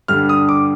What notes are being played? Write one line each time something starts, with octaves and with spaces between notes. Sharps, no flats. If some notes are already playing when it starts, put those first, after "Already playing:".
G2 D3 G3 F6
D#6
D6